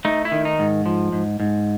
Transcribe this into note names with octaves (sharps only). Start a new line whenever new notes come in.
A3 D#4
E4
D#3
D#4
G#2
F3
G#2
G#2